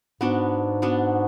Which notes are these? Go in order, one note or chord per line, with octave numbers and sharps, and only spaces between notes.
G#2 B3 D4 F#4
B3 D4 F#4